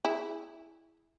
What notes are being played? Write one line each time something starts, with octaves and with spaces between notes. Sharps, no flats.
E4 G#4